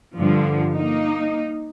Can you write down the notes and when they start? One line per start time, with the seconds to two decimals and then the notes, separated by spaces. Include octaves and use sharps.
0.17 G2 D3 F3
0.73 A#3 D#4